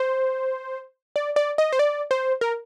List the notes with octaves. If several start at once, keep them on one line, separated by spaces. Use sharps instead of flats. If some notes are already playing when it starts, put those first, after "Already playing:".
Already playing: C5
D5
D5
D#5
C5
D5
C5
A#4